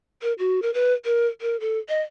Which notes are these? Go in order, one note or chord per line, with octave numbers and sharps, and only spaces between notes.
A#4
F#4
A#4
B4
A#4
A#4
A4
D#5